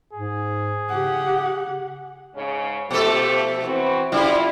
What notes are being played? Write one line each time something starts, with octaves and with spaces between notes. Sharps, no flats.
G#2 G#4
C#3 G4 F#5
G#2 C#3 C#4
B2 F3 A3 G4 A4
E3 C4 F#4
C#3 G3 E4 F4